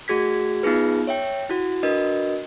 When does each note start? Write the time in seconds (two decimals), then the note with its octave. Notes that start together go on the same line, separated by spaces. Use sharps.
0.08 A3 F#4 G#4 G#6 B6
0.63 B3 D#4 F4 G#4 B4
1.07 C#5 E5 G5
1.49 E4 F#4
1.83 D4 F#4 A#4 B4 D#5